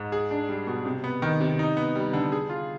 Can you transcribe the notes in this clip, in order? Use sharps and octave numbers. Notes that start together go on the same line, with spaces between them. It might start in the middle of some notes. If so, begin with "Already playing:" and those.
Already playing: G#2
G#4
D4
G3
B2
C3
B3
D#3
C3
D#4
B3
G3
D3
G#4
F4